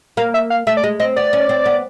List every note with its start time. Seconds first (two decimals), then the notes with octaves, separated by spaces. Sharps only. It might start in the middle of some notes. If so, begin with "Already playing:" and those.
0.17 A#3 F5
0.34 E5
0.50 F5
0.67 A3 E5
0.77 D5
0.84 G#3 D#5
1.00 C4 D#5
1.16 B3 D5
1.33 C#4
1.49 C4
1.66 B3